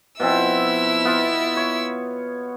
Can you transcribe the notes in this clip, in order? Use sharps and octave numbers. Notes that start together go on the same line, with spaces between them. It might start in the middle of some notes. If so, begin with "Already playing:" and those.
B2 F3 C4 E4 E6
B3 F4
C#5